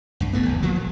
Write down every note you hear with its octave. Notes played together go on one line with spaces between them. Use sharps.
C2 G2
E1 G2 A3 B3
G#1 E2
F3 F#3 A#3
A#1